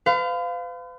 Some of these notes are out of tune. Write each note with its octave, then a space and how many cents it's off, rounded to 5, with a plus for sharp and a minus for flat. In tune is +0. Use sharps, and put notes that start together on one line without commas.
B4 +45 F5 +0